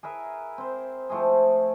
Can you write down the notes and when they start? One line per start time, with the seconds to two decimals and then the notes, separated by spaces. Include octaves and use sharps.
0.03 G#4 A#4 B4 E5
0.58 C4 C5
1.10 F3 A3 C4 G#4